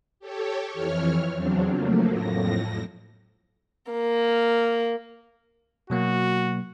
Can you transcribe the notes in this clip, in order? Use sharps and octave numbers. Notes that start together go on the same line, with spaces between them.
G4 A4 C#5
F2 E3 C#5 F6
E2 C#3 F#3 C4 D4
F3 F#3 A3 A#3
F2 A2 A#6
A#3
B2 F#3 A#3 F#4